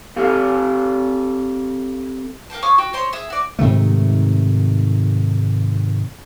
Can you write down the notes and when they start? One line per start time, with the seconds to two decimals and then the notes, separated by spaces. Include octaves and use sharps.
0.16 C4 G4 A4 F5
2.50 A#4 F5 G5 A5
2.63 C#5 F5 C#6 D#6
2.78 F#4 G5
2.93 D#4 C5 C#5 C6
3.13 G#4 E5 D#6
3.30 F#4 D5
3.59 G#2 C3 D#3 A3